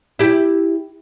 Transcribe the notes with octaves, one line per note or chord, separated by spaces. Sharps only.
E4 G4